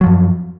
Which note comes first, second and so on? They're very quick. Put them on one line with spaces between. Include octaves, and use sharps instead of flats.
F#3 F3 F#2